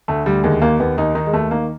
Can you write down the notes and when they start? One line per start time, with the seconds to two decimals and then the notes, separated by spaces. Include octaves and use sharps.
0.08 D2 A3
0.26 D2 G3
0.43 D#2 G#3
0.62 D#2 A#3
0.80 D#2 B3
0.97 D#2 D#4
1.15 D#3 D#4
1.26 G#3
1.33 D#2 A3
1.51 D#3 A#3